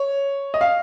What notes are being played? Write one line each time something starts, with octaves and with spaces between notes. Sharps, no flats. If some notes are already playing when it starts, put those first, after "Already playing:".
Already playing: C#5
D#5
F5